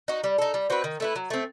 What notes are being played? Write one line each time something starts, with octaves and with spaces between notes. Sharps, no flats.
D#4 F#4
G3
D#4 A4
G3
C4 F#4 B4
D#3
A3 E4 B4
F#3
A3 C4